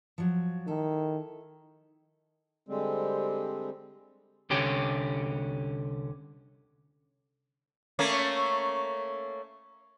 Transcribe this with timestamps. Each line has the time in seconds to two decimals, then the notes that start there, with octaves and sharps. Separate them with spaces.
0.18 F3 F#3
0.67 D#3 E4 A4
2.68 D3 G3 G#3 C4
4.50 C2 D3 C#4 G4
7.99 A3 A#3 C#4